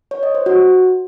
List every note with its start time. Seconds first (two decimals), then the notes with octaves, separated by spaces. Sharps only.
0.11 C#5
0.23 D#5
0.35 C5
0.46 F#4